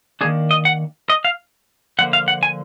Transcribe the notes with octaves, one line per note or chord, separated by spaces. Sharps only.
D#3 A#3 D4 G#4
D#5
F#5
D#5
F5
D3 F3 A#3 F#5
F5
F#5
G#5